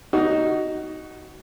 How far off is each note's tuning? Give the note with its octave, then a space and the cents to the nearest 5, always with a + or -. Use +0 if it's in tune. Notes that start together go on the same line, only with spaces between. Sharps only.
D#4 +5 F#4 +15